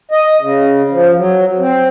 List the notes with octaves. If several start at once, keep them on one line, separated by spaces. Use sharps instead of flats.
D#5
C#3
F3
F#3
C4